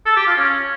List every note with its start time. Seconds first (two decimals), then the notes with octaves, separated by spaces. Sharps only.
0.06 A4
0.16 G4
0.26 F4
0.37 C#4